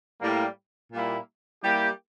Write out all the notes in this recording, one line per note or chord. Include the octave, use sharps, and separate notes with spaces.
A2 G3 A#3
A#2 G3 A#3 E4
G3 A#3 E4 G4